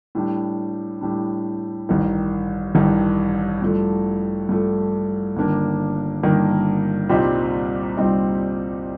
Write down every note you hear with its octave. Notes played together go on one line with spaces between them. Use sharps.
A2 G3 D4
A2 G3 D4
A1 G2 D#3
A1 G2 D#3
G2 F3 A3
G2 F3 A3
G1 G2 D#3 A#3 D4
G1 G2 D#3 A#3 D4
C2 A#2 G3 C4 D#4
C2 A#2 G3 C4 D#4